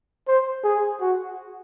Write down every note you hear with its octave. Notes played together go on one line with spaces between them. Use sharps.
C5
G#4
F#4